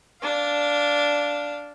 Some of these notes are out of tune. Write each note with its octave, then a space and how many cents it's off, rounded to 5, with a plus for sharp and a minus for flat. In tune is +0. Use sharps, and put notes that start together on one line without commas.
D4 -10 F5 +0